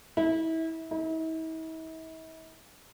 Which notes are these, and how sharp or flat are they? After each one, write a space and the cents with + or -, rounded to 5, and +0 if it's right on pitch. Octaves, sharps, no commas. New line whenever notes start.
E4 -30
E4 -45